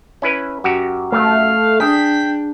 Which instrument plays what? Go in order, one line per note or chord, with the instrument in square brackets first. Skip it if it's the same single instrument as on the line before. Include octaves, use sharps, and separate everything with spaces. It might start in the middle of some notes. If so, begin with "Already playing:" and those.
[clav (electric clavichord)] C#4 E4 B4
F#2 F#4 G4
[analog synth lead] A3 [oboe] F5
[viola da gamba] D4 [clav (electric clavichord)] G#4 [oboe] G5 [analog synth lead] B6